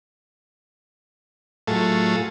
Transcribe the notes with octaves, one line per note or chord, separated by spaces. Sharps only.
A2 F#3 A3 F4 G#4 A4